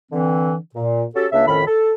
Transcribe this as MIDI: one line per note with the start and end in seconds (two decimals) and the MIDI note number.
0.12 0.55 50
0.12 0.55 52
0.12 0.55 60
0.75 1.05 46
1.15 1.27 61
1.15 1.27 66
1.15 1.27 67
1.15 1.27 69
1.32 1.47 37
1.32 1.47 49
1.32 1.47 58
1.32 1.47 62
1.32 1.47 76
1.47 1.61 41
1.47 1.61 45
1.47 1.61 51
1.47 1.61 61
1.47 1.61 69
1.47 1.61 83
1.66 1.94 69